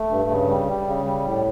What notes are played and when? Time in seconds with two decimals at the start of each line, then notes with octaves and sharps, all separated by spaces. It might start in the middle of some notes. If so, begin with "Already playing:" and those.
Already playing: A3
0.10 G2
0.30 C#3
0.49 G3
0.68 G3
0.87 C#3
1.06 G3
1.26 A2